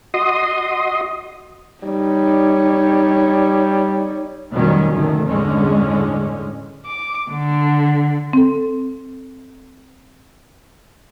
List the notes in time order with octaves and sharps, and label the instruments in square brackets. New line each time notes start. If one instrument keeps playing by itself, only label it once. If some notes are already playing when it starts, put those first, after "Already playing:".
[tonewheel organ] F#4 D#5 C6 D#6
[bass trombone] G3 [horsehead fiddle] D#4 C#5
[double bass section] F1 B2 D#3 F#3 G3 C#4
F1 D2 A2 D#3 A3
G1 E2 A2 D3 G#3 C#4
[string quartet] D6
D3
[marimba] C4 A4